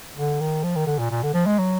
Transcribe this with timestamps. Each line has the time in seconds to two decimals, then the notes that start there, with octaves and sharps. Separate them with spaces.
0.16 D3
0.40 D#3
0.63 F3
0.76 D#3
0.86 D3
0.99 A#2
1.10 A#2
1.23 D3
1.34 F3
1.46 G#3
1.58 F#3